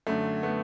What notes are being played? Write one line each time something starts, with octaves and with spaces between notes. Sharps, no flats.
F#2 D3 A3
A3 B3